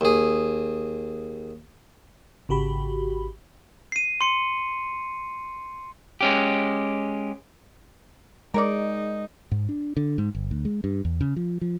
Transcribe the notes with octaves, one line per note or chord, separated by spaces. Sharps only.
D#2 G#4
G#1 C#3 F#4 G4 B5
C7 D#7
C6 C#7
G#3 C#4 G4
G#3 D#4 A#4 C#5 D5
G#2
D4
D3
G#2
G1
D2
G#3
G2
E2
C#3
F3
F3